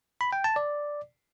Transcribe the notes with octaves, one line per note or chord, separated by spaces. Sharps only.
B5
G5
A5
D5